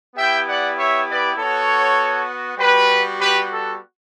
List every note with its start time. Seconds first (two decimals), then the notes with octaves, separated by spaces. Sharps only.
0.16 B3 E4 G4 E5 G5
0.46 D5 F#5
0.76 C#5 E5
1.08 B4 D5
1.37 B3 F#4 A4 C#5
2.58 G3 B3 F#4 G4 B4
3.18 G4 B4
3.49 A4